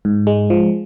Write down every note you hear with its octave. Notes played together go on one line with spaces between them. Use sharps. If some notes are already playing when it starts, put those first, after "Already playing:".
G#2
G#3
F3